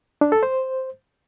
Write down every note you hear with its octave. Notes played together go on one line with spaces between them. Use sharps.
D4
A4
C5